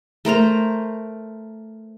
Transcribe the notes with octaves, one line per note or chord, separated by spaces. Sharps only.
A3 A#4 C5 A#5